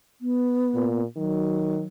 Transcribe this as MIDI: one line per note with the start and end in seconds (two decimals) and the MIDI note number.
0.21 1.00 59
0.74 1.04 46
1.16 1.84 51
1.16 1.86 54